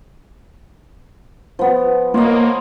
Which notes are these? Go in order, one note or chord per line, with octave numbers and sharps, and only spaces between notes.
F3 B3
A#3 F4 C#5 D#5